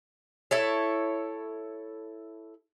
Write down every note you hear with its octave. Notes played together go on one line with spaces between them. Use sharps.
E4 A4 C#5